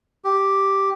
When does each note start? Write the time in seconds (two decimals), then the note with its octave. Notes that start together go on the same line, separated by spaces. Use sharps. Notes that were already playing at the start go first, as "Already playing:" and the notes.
0.25 G4